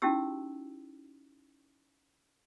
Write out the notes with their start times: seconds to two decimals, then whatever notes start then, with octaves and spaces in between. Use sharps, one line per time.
0.02 C#4 D#4 E4 F#4 G4 E6